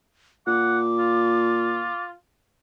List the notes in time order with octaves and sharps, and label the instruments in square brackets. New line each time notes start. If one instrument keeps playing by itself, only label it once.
[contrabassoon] A#2 [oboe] F#5 [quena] D6
[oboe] F4